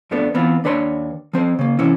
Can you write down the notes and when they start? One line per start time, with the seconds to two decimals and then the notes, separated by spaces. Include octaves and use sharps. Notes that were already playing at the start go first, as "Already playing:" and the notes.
0.11 F2 F3 A3 B3 D4
0.34 E3 B3 C4 F4
0.64 D#2 D4 B4 C#5 A#5 C6
1.33 F3 C4 C5
1.59 C#3 A#3
1.79 C3 E3 C#4 E4